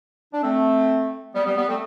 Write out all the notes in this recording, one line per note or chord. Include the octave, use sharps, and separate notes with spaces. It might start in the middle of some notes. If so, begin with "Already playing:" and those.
D4
A3 C4
G3 B3
G3 B3
G3 B3
A3 C4